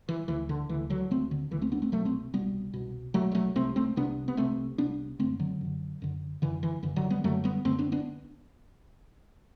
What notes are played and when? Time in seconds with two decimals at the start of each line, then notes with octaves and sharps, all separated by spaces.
0.09 E3
0.28 D2 D3 E3
0.49 D3
0.69 D2 D3 E3
0.90 D3 F#3
1.11 D2 D3 A3 C4
1.31 D3
1.51 D2 D3 E3
1.62 A3 C4
1.72 B3 D4
1.82 A3 C4
1.92 C2 B2 F#3 A3
2.05 A3 C4
2.33 C2 B2 G3 B3
2.74 C2 B2
3.14 C2 B2 F#3 A3
3.32 G3
3.35 F#3 A3
3.56 C2 C3 A3 C4
3.76 A3 C4
3.96 C2 C3 B3 D4
4.28 B3
4.37 C2 C3 A3 C4
4.78 C2 C3 B3 D4
5.19 F#2 D3 A3 C4
5.39 D3 F#3
5.61 F#2 D3
6.02 F#2 D3
6.42 F#2 D3 E3
6.63 E3
6.83 F#2 D3 E3
6.96 D3 F#3
7.10 G3 B3
7.24 F#2 D3 F#3 A3
7.44 G3 B3
7.65 F#2 D3 A3 C4
7.79 B3 D4
7.92 B3 D4